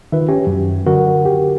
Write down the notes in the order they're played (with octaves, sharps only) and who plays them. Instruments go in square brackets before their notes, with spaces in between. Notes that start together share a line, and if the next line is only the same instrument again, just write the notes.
[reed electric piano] D#3 [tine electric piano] F4 B4 E5
[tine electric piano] C#4 C#5 [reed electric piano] G4
[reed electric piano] F#2 [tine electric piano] F#4
[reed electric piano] D3 F#4 [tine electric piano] F#3 D4 A#4
[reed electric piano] G4